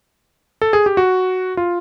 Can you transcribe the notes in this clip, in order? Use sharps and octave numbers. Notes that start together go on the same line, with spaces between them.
A4
G#4
G4
F#4
F4